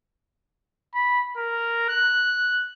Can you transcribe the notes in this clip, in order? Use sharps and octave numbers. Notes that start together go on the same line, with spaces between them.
B5
A#4
F#6